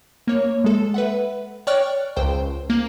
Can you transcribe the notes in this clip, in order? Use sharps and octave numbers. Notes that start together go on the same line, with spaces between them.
A#3 C#5
G#3 A4
B4 E5 F#5
C#5 D5 G5 C#6 F6 F#6
C#2 C5 G5
A#3